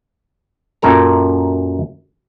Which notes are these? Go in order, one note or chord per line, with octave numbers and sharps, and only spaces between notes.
F#2 A#2 A4 A#4 A#5